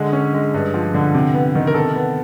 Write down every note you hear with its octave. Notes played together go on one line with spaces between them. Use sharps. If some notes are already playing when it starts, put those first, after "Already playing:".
Already playing: D3 G#3
C#4
G#3
G2
F3
D3
C3
B3
D#3
A#4
C3 A4
B3